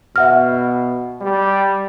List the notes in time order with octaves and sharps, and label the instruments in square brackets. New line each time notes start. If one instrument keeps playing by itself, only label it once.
[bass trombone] B2 [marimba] E5 F#5 F6
[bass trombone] G3